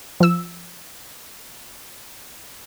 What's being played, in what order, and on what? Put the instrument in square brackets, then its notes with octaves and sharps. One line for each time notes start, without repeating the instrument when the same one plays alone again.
[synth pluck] F3 E6